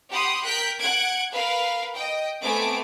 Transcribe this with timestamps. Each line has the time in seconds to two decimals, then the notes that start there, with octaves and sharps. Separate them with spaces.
0.11 G4 F#5 B5 C6 D#6
0.45 A#4 G5 F#6 G6 B6
0.80 F#5 F#6 G#6 D7
1.33 A#4 B4 F5
1.96 D#5 G5
2.42 A3 B3 C4 G#5 D6 D7